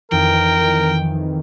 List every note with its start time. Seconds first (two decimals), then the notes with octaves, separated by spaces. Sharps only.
0.11 F2 D#3 E3 A#4 G5